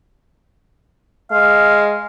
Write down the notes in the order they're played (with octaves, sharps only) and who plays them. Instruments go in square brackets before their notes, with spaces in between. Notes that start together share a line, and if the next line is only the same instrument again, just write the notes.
[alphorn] G#3 [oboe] F5